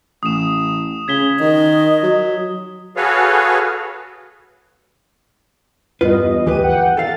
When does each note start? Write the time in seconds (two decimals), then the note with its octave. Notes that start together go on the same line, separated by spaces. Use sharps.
0.23 A1 D#6 E7
1.08 C#3 G#6 B6 G7
1.40 D#3 D#5
2.03 F#3
2.96 F#4 G#4 A4 B4 C#5 F5
6.01 E2 G2 F4 B4 D#5
6.46 D2 E3 G4 B4 D#7
6.63 F#5 G5
6.97 A4 F5 A6